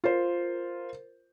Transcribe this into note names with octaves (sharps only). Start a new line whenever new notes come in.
F4 A#4 C5